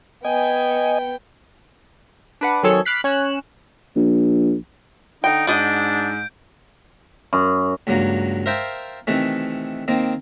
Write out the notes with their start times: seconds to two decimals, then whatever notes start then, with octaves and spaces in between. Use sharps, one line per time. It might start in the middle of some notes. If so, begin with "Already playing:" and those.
0.25 B3 D#5 G5 G#5
2.41 D4 B4 F#5
2.63 D#3 F#3 C4 G#4 A4 C#5
2.85 B5 D6 F6 F#6 B6 C7
3.04 C#4 C#5 F#6 E7
3.96 A#1
5.24 D3 D#4 G5 D7
5.47 G#2 D4 F#4 D#5 G6 D7
7.33 F#2
7.87 C#2 G2 F#3 A#3
8.46 A#4 C5 E5 F5 G5 A5
9.07 C3 D#3 E3 A3
9.88 D#3 A#3 C4